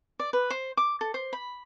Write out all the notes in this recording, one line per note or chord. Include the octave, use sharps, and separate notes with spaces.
D5
B4
C5
D6
A4
C5
B5